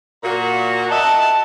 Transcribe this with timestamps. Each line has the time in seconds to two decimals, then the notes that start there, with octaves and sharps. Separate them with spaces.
0.24 A#2 F#4 A#5
0.91 D#5 E5 F#5 A5